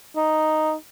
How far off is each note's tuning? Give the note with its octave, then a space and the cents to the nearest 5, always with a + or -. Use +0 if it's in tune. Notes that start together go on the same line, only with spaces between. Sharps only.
D#4 +0